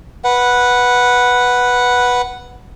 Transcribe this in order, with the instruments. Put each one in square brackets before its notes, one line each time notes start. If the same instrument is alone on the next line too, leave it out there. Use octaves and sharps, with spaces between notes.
[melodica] B4 F#5